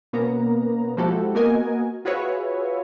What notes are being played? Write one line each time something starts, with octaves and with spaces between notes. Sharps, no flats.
B2 A#3 B3 C#4 A#5
F3 G#3 E4 F#4 G4 A4
A#3 B3 F#4 A#4 D#5 G#5
F4 F#4 G#4 B4 C#5 E5